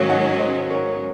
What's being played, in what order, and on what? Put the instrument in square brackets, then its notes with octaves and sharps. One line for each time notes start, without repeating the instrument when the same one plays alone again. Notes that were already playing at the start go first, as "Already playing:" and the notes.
Already playing: [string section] G#2 D#3 F#3 C#4 [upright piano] C5 C#5 F5
[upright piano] D#5 F#5
C5 D#5
A#4 C#5